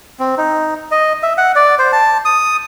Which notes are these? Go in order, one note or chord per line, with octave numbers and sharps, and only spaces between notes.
C4
D#4
D#5
E5
F#5
D5
C5
A5
D#6